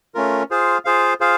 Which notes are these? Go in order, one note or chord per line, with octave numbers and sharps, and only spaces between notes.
A3 C#4 F4 A#4
F4 G#4 C5 F5
F4 G#4 C5 F5
F4 G#4 C5 F5